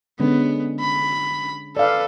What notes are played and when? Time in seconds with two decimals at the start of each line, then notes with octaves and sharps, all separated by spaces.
0.20 D3 G#3 B3 C#4
0.81 B5
1.77 A4 B4 D5 F5